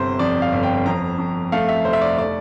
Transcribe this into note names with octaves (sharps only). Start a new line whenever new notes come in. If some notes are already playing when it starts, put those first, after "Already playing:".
Already playing: G1 C3 C5
F2 D5
F5
G1
G5
F2 A#5
F2
A3 F5
E5
F1 C5
E5
D5
A3 D5